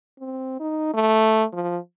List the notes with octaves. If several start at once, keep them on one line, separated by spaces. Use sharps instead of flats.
C4
D#4
A3
F3